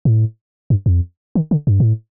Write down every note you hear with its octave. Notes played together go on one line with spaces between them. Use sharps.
A2
G2
F2
D#3
D3
G2
A2